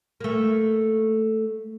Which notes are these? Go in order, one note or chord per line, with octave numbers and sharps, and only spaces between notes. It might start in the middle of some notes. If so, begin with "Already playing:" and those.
A3 A#3